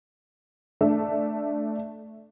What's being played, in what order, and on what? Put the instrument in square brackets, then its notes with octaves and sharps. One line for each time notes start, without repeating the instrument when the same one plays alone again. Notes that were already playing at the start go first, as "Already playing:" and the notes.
[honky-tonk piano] A3 D4 E5